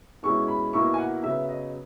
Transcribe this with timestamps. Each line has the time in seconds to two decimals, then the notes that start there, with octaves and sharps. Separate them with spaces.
0.23 B2 G#3 C#4 E4 C#6
0.48 B5
0.73 B2 A#3 E4 C#6
0.94 G#5
0.98 F#5
1.23 C#3 F#3 B3 E5
1.49 D#5